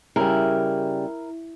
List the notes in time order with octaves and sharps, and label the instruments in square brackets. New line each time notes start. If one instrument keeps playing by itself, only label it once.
[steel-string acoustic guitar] C#3 G3 [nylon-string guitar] E4 [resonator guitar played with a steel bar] A#4